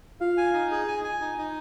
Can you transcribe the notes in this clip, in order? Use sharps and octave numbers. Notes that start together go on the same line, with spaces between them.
F4 F5
G#5
D#4
G#4
G#5
G#5
D#4
D#4